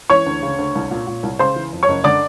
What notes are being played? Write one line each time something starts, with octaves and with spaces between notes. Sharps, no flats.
E3 C#5 C#6
D2
C#3
D2
C2
A#2
A#2
C2
C#3 C5 C6
E3
F2
C#5 C#6
F#1
D3 D5 D6